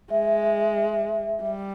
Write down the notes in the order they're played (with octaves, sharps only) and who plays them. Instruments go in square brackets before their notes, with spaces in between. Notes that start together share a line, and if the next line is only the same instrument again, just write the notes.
[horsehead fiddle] G#3 [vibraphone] E5
[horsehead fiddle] G3